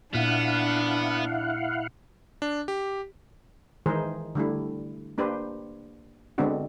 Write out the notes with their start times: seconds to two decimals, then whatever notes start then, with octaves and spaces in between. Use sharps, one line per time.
0.14 A#2 B3 D4 E4 F5 F#5
2.42 D4
2.68 G4
3.86 D#3 E3 G#3 G#4 A#4 C5
4.35 D3 G3 A3 E4
5.18 A#3 D4 G4 B4 C5
6.38 D3 G#3 B3 C4 D4 F#4